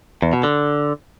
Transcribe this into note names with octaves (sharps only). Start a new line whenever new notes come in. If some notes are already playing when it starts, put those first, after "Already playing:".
E2
B2
D3